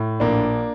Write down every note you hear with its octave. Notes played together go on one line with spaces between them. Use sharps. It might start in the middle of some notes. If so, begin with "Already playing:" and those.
Already playing: A2
A#1 A#3 D4